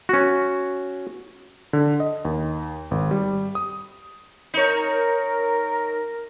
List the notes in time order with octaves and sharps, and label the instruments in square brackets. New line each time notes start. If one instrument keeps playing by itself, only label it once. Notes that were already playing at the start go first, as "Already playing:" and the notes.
[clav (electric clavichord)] C#4 F#4
[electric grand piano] D3
D#5
D#2
G#1
G3
D#6
[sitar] D#4 C#5 [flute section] A#4